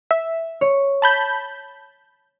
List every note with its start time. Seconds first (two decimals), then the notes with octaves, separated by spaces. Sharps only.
0.11 E5
0.61 C#5
1.02 A5 B5 G6